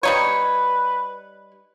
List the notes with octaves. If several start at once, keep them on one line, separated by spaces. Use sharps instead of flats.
G3 D#4 B4 C#5